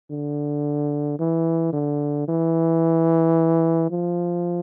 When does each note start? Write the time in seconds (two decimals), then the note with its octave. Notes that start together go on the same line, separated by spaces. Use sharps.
0.11 D3
1.19 E3
1.73 D3
2.28 E3
3.91 F3